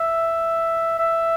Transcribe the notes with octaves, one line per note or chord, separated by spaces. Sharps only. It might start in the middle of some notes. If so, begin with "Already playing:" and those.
Already playing: E5
E5